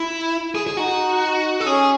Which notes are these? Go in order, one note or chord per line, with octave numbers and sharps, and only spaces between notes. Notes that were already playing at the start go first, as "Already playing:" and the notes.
Already playing: E4
G#4
G#4
D#4 F#4
A4
C#4 G#4